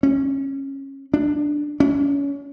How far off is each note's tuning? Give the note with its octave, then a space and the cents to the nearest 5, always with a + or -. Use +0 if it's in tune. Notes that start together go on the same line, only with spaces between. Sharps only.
C#4 -20
D4 +5
C#4 +30